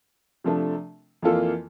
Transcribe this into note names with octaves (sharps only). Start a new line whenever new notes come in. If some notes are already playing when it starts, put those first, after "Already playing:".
C3 F3 A3 D4
F2 E3 A#3 F4 A4